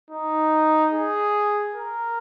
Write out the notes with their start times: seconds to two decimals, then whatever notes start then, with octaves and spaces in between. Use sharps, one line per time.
0.11 D#4
0.93 G#4
1.75 A#4